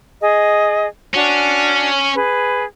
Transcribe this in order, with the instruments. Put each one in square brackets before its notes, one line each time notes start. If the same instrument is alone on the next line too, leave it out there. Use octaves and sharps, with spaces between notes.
[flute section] G#4 D#5
[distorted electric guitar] C#4 [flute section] D4 F#4
[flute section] G#4 B4